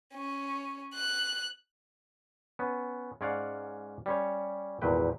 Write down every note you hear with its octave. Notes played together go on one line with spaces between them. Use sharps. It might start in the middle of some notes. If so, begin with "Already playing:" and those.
C#4
F#6
B3 C#4
G#2 C#4 C#5 D5 F5 F#5
G3 C#4 C#5
G#1 E2 A#2 B4 G5